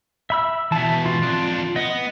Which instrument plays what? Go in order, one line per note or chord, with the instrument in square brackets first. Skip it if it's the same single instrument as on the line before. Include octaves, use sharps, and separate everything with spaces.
[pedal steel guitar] E5 B5 E6
[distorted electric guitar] E2 B2 [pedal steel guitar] E5 A5
[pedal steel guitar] F4
[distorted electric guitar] F2 D4
[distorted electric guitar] B3 [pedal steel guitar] D#5